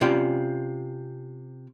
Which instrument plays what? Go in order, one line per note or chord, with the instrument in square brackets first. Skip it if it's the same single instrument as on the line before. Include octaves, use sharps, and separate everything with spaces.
[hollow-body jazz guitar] C3 C#4 F4 D5 G5